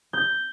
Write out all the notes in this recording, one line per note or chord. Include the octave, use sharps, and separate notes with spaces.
G6